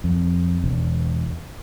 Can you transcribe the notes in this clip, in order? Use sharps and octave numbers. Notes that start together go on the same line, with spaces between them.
F2
E1